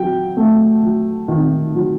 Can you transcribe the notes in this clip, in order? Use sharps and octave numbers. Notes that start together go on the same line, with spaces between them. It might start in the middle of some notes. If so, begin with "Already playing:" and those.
Already playing: F#3 G5
A3
F#3
D#3
F#3